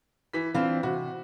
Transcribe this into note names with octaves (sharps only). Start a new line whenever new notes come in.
E3 B6
E3 C4 D4 F4
C3 F#4